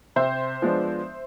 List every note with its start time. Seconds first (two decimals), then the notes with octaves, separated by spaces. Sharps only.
0.16 C3 C5 E5
0.62 F3 G#3 B3 D4